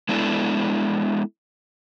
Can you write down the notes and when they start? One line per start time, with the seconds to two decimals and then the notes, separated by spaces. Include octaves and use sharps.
0.09 G#3 B3 D4 E4 F#4 A4